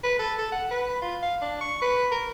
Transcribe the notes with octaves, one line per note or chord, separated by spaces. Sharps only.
B4
A4
A4
F#5
B4
F4
F5
D4
C#6
B4
A#4